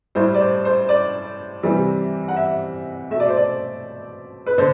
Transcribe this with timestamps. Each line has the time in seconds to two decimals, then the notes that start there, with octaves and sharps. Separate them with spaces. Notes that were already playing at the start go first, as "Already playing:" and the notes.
0.15 A2 G3 C5
0.34 D5
0.40 C5
0.65 C5
0.89 D5
1.63 C3 E3 G3
2.28 F#5
2.36 E5
3.10 A3 E5
3.15 B2 D5
3.28 C5
3.37 D5
4.46 B4
4.58 D3 C5